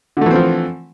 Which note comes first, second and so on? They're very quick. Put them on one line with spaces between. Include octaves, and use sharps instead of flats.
D3 A3 E3 C4 F3